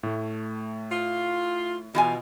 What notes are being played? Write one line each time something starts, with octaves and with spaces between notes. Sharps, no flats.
A2 A3
F4
B2 E3 F4 G#5